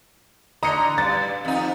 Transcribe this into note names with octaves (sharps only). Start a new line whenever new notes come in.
D3 D#5 A#5 C#7
G2 A6
F2 D#4